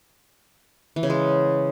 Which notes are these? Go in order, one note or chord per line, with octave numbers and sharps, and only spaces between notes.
E3
C#3
G#3